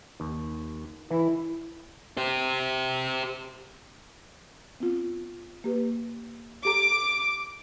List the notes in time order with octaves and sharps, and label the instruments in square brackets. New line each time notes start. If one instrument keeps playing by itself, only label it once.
[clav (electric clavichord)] D#2
[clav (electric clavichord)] E3 [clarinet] E4
[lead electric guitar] G4 C5
[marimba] B3 C4 F4
A#3 G4 B4
[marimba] G4 A4 A#5 [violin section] D6